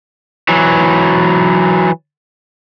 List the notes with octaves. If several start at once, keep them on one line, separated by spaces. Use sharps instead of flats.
E3 F#3